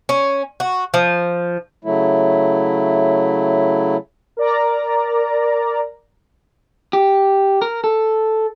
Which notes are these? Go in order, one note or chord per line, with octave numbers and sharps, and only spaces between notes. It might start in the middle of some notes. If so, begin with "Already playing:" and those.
C#4
F#4
F3
C#3 F#3 A3 E4
A#4 D5 A#5
G4
A#4
A4